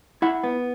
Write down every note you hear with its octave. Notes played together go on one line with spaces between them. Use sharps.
E4 F#5
B3